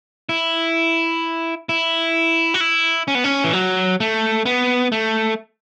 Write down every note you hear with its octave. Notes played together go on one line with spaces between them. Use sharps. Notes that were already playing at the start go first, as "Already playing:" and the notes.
E4
E4
F#4
E4
C#4
B3
C#4
E3
F#3
A3
B3
A3